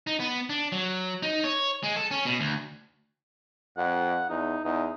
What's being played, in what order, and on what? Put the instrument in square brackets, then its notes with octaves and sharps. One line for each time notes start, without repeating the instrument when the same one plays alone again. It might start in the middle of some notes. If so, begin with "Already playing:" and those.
[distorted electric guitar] D#4
B3
D4
F#3
D#4
C#5
G#3
A4
C#4
B2
D2
[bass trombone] F2 [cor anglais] F#5
[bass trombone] E2 [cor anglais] D#4
[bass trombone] E2 [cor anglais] D#4